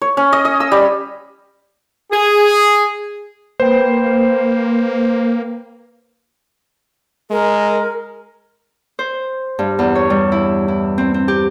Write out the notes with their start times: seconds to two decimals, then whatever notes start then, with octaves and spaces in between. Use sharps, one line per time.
0.02 C#5
0.17 C#4
0.33 D#5
0.45 D#5
0.60 E6
0.72 G3
2.12 G#4
3.60 A#3 B4 C5 G5
7.31 G#3 A#4
8.99 C5
9.59 G2
9.79 E2
9.95 C#5
10.10 G3
10.32 E4
10.68 E4
10.98 C4
11.14 C4
11.28 G4